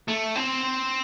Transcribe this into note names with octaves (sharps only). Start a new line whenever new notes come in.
A3
C4